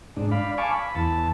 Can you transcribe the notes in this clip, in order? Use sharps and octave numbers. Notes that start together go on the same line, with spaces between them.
G#2 D4
D5 F5 B5
F5 G#5 A5 C#6 D6
B5
E2 A5